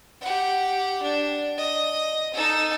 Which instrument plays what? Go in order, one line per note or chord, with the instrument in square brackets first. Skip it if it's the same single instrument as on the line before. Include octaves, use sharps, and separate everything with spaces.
[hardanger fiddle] G4 F#5
D4
D#5
D#4 A4